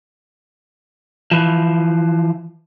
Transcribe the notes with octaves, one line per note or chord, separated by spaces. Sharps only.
E3 F3